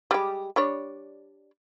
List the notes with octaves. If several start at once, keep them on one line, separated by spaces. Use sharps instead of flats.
G3 G#3 G4
G3 D4 C#5